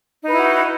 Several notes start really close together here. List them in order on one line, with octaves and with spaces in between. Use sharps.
D#4 B4 E4 F#4